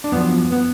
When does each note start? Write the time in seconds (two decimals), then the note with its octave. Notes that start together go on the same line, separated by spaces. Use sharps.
0.04 D4
0.12 F#2 F3 B3
0.52 B3